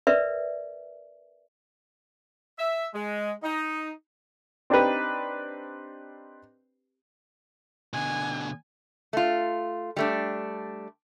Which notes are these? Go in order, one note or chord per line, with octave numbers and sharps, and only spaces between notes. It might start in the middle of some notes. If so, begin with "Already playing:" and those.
A#4 B4 D5 E5
E5
G#3
D#4
C4 D4 D#4 G4 B4
B2 D3 G#5
A3 F4
G3 A3 D4